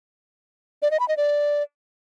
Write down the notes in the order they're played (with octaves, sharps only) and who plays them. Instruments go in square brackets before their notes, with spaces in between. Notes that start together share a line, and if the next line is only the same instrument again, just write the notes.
[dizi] D5
D#5
B5
D#5
D5